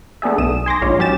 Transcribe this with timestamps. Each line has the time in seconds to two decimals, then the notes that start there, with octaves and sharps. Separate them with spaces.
0.22 A3 B3 D4 G#4 E5
0.38 B1 D#6 E7
0.66 G#5 C6 D6 A#6
0.82 A#1 G#2 F4 C#5
0.99 F#3 C#4 G4 G#5 A6 E7